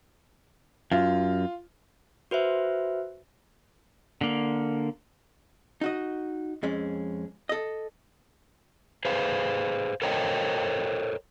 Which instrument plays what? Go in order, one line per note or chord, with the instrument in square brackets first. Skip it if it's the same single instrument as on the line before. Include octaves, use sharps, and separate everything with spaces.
[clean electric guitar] F#2 [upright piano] F4
[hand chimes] F#4 B4 C5 E5
[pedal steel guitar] D3 A#3
[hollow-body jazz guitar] D#4 F#4 D#5
F2 G#3 C#4
A4 D#5
[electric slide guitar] G#4 B4 C5 F5
A4 A#4 C5 C#5 D#5 G5